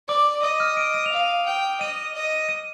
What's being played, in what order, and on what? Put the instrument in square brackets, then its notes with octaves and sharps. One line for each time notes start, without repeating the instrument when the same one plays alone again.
[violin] D5 [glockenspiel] D6
[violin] D#5 [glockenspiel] D#6
[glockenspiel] F6
D7
D#7
F7
[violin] F5 [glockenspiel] D#7
[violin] G5
[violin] D#5 [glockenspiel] D#7
[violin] D#5
[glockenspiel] D#7